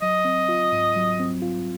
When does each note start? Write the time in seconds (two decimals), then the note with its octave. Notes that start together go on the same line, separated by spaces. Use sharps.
0.02 F#3 D#5
0.25 C4
0.49 F4
0.72 G#2
0.96 F#3
1.20 C4
1.42 F4